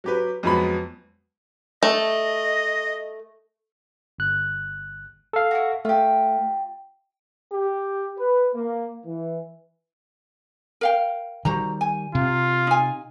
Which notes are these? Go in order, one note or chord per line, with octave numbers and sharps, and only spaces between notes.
F#3 G4 B4
F2 F#3 G#3 B3 B5
A3 D#5
G1 F#6
A4 F5
E4 F#4
A3 F4 G4
G4
B4
A#3
E3
A#4 F5 G5
D#3 G3 F#4 C5 A#5
G#5
C3 F4
D#4 G#5